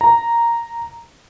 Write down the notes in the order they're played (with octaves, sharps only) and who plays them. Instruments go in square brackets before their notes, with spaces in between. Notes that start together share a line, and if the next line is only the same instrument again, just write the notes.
[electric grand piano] A#5